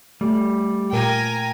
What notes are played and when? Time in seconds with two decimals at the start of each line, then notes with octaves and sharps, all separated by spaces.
0.21 G3 A3
0.93 A#2 A#4 G5 G#5 A#5